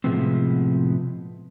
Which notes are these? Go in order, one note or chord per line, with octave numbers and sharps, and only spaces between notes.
A2 C3 F3 G#3 B3 C4